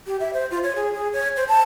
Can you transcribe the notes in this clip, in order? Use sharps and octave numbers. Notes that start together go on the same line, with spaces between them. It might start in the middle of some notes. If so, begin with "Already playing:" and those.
G4
E5
C5
F4
C#5
G#4
G#4
C#5
C5
A5